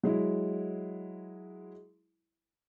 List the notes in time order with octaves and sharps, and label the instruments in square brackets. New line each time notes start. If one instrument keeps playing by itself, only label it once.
[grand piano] F#3 G#3 E4